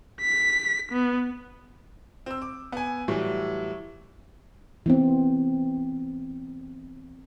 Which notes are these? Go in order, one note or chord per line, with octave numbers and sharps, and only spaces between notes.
B6
B3
C4 E6
D6
B3 G#5
A2 E3 F#3 G3
E3 B3 C4